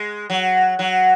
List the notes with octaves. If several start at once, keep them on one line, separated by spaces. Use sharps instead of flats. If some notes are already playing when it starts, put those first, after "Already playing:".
Already playing: G#3
F#3
F#3